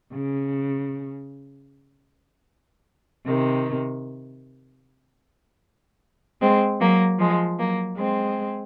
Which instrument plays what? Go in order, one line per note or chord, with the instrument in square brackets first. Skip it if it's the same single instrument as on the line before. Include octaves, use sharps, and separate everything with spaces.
[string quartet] C#3
C3 D#3
G#3 C4
F#3 A#3
F3 G#3
F#3 A#3
G#3 C4